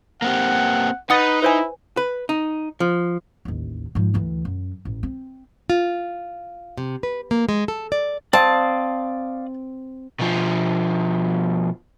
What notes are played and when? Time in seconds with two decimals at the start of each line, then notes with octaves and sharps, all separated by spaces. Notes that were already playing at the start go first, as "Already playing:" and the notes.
0.22 A#3 C4 G4 F#5
1.10 D#4 B4 F#5 D#6 A6
1.42 E4 B4 C5 G#5
1.97 B4
2.29 D#4
2.80 F3
3.45 A1 D#2
3.95 G#2 F3
4.14 D2 E3
4.45 F#2
4.85 A1
5.03 C4
5.70 F4
6.78 C3
7.03 B4
7.31 A#3
7.49 G#3
7.68 A4
7.92 D5
8.33 C4 D5 F5 A5 D#6
10.19 B2 F3